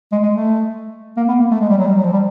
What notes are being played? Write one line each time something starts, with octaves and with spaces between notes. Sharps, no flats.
G#3
G#3
A3
A#3
B3
A#3
A3
G#3
G3
F#3
G3
F#3
F3
G3